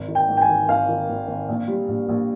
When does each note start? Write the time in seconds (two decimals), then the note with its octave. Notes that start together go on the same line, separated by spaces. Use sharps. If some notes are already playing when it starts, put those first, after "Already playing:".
Already playing: G#1
0.08 D#3
0.15 G5
0.28 G#2
0.37 G5
0.41 G#5
0.48 D#3
0.69 G#1 F5
0.89 D#3
1.09 G#1
1.28 G#1
1.49 A#1
1.68 G3
1.89 A#1
2.09 A#1